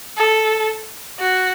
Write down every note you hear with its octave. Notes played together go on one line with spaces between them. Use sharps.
A4
F#4